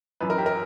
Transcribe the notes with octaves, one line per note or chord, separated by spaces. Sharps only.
F#2 E3 B4
A#4
G4
A#4